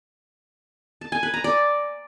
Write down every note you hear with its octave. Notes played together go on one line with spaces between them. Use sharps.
A5
G#5
B4
A#5
D5